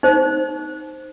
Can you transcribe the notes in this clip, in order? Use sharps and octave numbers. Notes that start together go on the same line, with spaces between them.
D#4 C5